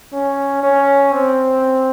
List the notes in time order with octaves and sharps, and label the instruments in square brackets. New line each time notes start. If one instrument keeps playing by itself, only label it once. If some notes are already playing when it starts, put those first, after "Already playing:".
[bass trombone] C#4
C#4
C4